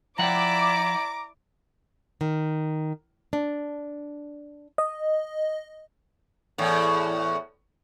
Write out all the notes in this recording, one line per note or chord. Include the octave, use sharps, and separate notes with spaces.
F3 E4 D5 F#5 G5 A#5 D6
D#3
D4
D#5
E2 A2